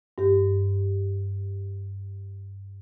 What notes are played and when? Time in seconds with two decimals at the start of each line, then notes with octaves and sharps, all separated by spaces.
0.18 G2 G4